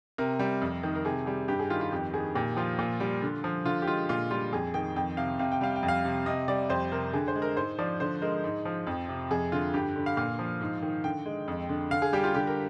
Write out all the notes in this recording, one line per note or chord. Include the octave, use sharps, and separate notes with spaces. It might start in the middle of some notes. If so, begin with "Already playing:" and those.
C3 A#4
G3
F2
D#3
A#4
C3 G#4
G3 G#4
G2 G4
G#4
D#3 F4
F4
F2 G4
D#3 G#4
A#2 G4
F3 F4
A#2
G3
D3
F3
D3 F4
G4
G#3 F4
A#2 F4
G3 F4
F2 G#4
D#3 G5
F2 G5
C3 F5
C3 F5
G5
G3 F5
G5
F2
F5
C3
C3 D#5
G3 D5
F2 C5
C3 A#4
D3 G#4
C5
G#3
A#4
G#2 C5
F3 D5
D3 C5
G#3 A#4
G#2
F3
F2
C3
F2 G#4
D3 F4
G2 G4
D3
F5
A#2 F5
F3
G#2
D#3
D3 G5
G#3
F2
D3
D3 F5
G#4
G3 G4
F4
D3 G4
A#4